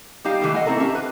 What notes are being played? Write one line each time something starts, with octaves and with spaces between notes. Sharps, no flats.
G3 D#4 G4 F5
D#3 E3 G#3 A3 E4 G4
A4 D#5 F#5 G#5
A3 C4 E4 A4 A#4
C#4 G4 E5 A5
B4